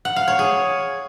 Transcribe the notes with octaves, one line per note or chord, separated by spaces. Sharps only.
F#5
F5
C#5
G#4